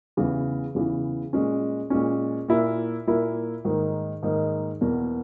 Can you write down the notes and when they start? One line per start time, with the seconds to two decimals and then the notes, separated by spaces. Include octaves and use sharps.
0.17 E2 C#3 E3
0.75 E2 C#3 E3
1.33 A#2 G#3 C#4
1.90 A#2 G#3 C#4
2.48 A#2 A#3 E4
3.07 A#2 A#3 E4
3.65 G#2 D#3 A#3 D#4
4.23 G#2 D#3 A#3 D#4
4.81 E2 B2 A#3